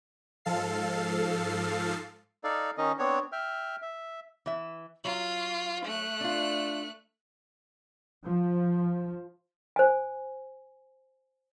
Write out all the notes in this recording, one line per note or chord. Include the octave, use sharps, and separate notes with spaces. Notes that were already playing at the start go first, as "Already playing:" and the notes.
G#2 F3 A4 F5 A6 C7
D#4 A4 D5 F5
D#3 C#4 D#4 D#5
B3 C4 D4 C#5
E5 G5 F6
E5
E3 E5
F#3 F4
A3 F#6
D4 F4
F3
C5 G#5